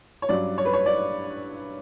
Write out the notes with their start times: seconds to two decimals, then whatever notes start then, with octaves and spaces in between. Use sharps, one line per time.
0.22 C#5
0.29 G2 F#3 C#4 D5
0.58 C#5
0.65 B4
0.73 C#5
0.86 D5